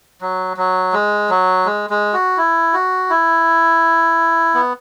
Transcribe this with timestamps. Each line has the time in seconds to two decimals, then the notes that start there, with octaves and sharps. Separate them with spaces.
0.21 F#3
0.57 F#3
0.93 G#3
1.30 F#3
1.65 G#3
1.90 G#3
2.13 F#4
2.37 E4
2.74 F#4
3.10 E4
4.54 B3